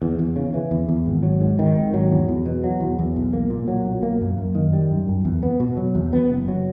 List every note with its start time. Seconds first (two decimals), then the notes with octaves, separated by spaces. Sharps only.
0.02 E2
0.19 E2
0.36 C#3
0.54 E3
0.71 E2
0.88 E2
1.06 G#1
1.23 F#3
1.41 G#2
1.59 D#3
1.75 G#1
1.94 F#3
2.11 E2
2.28 E2
2.46 B2
2.64 F#3
2.80 E2
2.99 E2
3.16 B1
3.33 A#3
3.50 A#2
3.68 F#3
3.85 B1
4.03 A#3
4.21 F#2
4.38 F#2
4.55 D#3
4.73 G3
4.91 F#2
5.08 F#2
5.25 E2
5.43 B3
5.60 B2
5.77 F#3
5.95 E2
6.13 B3
6.30 F#1
6.48 F#3